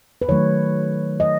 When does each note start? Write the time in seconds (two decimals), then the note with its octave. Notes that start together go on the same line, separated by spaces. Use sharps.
0.22 B4
0.29 D#3 F#3 A3 C#5
1.20 D#5